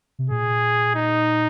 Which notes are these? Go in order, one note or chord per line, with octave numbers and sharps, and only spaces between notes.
C3
A#2 G#4
D#4